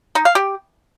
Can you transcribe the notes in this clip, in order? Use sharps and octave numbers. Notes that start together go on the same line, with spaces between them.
D#4
F5
G4